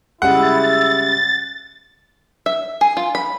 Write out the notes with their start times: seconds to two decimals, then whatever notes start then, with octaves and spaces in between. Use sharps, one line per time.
0.22 C#3 G3 G#3 E4 F#5 A6
2.46 E5
2.81 G#4
2.97 F4
3.15 B5